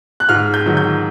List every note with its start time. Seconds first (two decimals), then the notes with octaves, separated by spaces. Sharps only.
0.20 F#6
0.29 G#2 F6
0.54 G6
0.66 D#3 F#3
0.77 G6